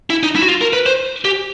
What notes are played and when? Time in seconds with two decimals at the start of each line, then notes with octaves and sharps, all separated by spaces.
0.10 E4
0.23 D#4
0.36 E4
0.42 F#4
0.48 F4
0.61 A#4
0.73 B4
0.86 C5
1.25 G4